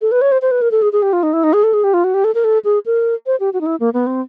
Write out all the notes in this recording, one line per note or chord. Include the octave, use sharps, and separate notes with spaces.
A4
B4
C#5
C5
C5
B4
A#4
A4
G#4
G#4
G4
F4
D#4
E4
D#4
G#4
A4
G#4
G4
F4
F#4
G4
A4
A#4
A4
G#4
A#4
C5
G4
F#4
D#4
E4
A#3
B3
C4